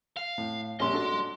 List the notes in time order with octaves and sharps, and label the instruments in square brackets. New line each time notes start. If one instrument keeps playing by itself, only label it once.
[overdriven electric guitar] F5
[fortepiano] A2
[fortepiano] A#1 G3 C#4 [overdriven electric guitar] D#5 C6
[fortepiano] D4 F#4 A4